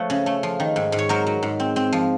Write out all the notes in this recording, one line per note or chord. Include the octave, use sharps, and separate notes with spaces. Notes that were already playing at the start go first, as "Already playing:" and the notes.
Already playing: F3 A3 B4 C#5
C#3
A3
F3
D#3
G#2
G#2
C#5
F#3 A#4 C5
F#3
G#2
C4
C4
F3